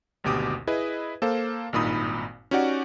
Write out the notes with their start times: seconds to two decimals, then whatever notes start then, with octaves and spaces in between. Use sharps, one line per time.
0.24 G#1 D2 B2 G4 D6 D#6
0.67 E4 G#4 B4 D#5
1.22 A#3 A4 C5 F5
1.73 G#1 G2 A#2 D#4 B5 D#6
2.51 C#4 D#4 F#4 G4 D5 F#5